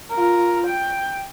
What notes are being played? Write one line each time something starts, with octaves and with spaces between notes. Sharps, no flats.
F4 A#4
G5